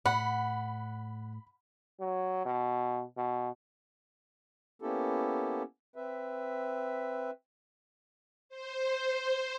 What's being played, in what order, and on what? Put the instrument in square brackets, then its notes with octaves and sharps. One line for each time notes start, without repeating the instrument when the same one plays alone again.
[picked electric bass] A2 [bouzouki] F#5 [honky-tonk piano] B5
[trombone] F#3
B2
B2
[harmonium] A#3 B3 C#4 E4 G4 A4
C4 B4 E5
[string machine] C5